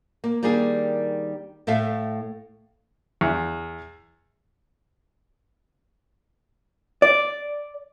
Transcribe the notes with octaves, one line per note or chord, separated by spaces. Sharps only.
A#3
D#3 G3 A#3 D4 G#4
A2 A3 A4 E5 F5
E2
D5